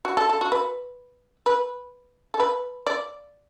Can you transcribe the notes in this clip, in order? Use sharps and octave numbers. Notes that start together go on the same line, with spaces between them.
F#4
A4
A4
F#4
B4
B4
A4
B4
D5